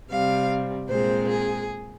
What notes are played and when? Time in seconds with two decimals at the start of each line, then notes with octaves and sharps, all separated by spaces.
0.09 C3 G3 C4 F5
0.89 A#2 G#3 C4 C5
1.29 G#4